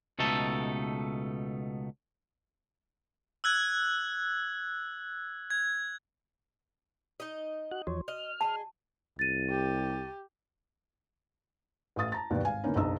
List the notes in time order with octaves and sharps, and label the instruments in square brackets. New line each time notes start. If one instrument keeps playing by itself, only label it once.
[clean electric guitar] C#2 B2 A3 D#4 A4
[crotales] E6 F#6 G#6
G#6
[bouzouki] D#4 D#5
[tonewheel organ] F#4 F#6
[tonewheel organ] E2 F3 C#5 [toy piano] F#4
[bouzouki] D#5 [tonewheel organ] F6
[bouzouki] G#4 C#5 D#5 [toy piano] A5
[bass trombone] C2 [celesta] A6 D#7
[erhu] G4
[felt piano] A1 A3 F5 D#6 A6
A5 A#5 A6
G1 D#2 B2 D5
G#1 F5 G#5
D3 E3 A#3 B3 C#4 D#4
F#1 B1 D4 D#5 A#5 E6